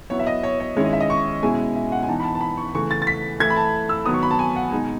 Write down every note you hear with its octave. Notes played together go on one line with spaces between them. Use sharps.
F#3 B3 E4 C#5
E5
D#5
C#5
C#5
D#3 G#3 C#4 E4 C#5
D#5
E5
D#5
C#6
B2 G#3 C#4 E4 G#5
E5
F#5
G#5
E3 B3 D#4 A5
B5
A5
A5
B5
C#6
C#3 E3 A3 C#6
A6
A6
B6
E3 A3 E4 G#6
B5
A5
E6
D#3 F#3 B3 D#6
C#6
B5
A5
G#5
F#5
B2 G#3 D#4 G#5